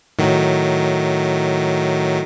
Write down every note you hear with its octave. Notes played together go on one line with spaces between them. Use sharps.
A2 D#3 F#3